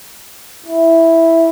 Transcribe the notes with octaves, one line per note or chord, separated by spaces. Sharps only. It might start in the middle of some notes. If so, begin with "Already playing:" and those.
E4